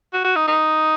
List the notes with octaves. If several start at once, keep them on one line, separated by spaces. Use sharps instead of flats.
F#4
F#4
D#4
D#4